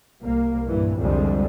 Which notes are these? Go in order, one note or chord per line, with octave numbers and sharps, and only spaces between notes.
C2 A#3
G2 A#2 E3
C2 F2 D3 G3 G#3